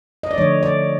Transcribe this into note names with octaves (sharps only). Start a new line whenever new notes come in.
D#5
D5
D3 F3 A3 C#5
D5